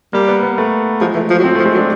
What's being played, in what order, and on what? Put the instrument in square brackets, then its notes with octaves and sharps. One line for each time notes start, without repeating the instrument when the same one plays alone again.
[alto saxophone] G3 [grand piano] A#3
[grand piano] B3
B3
A3
[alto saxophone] F3 [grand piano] G#3
[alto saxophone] E3 [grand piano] A3
[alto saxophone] F3
F#3
[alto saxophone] F3 [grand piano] C4
[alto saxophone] F3 [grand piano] A3
[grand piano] G#3
[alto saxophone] F#3
[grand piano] D4